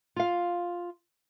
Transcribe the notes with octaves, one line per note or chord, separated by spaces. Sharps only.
F4 F5